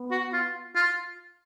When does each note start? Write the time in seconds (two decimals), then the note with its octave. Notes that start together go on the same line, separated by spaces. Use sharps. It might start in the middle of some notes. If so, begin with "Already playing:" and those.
Already playing: B3
0.11 F#4
0.33 F4
0.75 F4